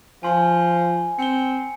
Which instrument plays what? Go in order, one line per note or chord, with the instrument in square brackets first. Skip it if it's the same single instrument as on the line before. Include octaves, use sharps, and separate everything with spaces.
[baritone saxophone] F3 [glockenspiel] G#5 C6
[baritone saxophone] C4 [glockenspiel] C#7 G7